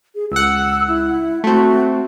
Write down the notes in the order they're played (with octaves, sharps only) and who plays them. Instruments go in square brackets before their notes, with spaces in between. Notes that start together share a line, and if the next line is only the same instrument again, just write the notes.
[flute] G#4
[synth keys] C#2 F#5 [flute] E6
[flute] E4
[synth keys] A3 C4 [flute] F#4